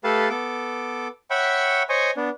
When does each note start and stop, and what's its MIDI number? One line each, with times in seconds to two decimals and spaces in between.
0.04 0.29 57
0.04 0.29 67
0.04 0.29 69
0.04 0.29 71
0.04 0.29 77
0.04 0.29 81
0.30 1.08 59
0.30 1.08 69
0.30 1.08 86
1.30 1.83 73
1.30 1.83 76
1.30 1.83 78
1.30 1.83 79
1.30 1.83 83
1.30 1.83 85
1.89 2.11 72
1.89 2.11 73
1.89 2.11 75
1.89 2.11 80
1.89 2.11 85
2.17 2.29 59
2.17 2.29 62